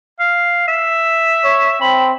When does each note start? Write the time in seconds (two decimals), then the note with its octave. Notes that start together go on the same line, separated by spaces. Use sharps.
0.20 F5
0.68 E5
1.44 C#5
1.81 C4 B5